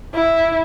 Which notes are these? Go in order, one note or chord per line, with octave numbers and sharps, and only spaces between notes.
E4